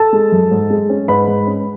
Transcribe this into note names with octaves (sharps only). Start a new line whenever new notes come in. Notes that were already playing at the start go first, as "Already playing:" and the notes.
Already playing: A4 A5
G#3
F#2
G#2
G#3
C#4
G#2 B4 B5
G#2
C#4